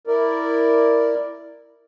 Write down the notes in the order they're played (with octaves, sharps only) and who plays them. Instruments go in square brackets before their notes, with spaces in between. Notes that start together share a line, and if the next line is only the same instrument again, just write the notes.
[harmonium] E4 A#4 D5